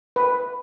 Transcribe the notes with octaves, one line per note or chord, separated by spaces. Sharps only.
B4